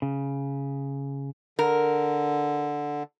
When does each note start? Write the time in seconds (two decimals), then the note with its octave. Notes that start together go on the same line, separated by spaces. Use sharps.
0.02 C#3
1.59 D3 A#4